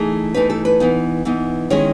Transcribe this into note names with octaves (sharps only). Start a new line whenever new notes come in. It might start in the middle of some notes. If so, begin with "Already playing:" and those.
Already playing: E3 A3 D#4 G#4
E3 A3 D#4 B4
A4
B4
E3 B3 D#4
E3 B3 D#4
D#3 G#3 C#4 E4 C#5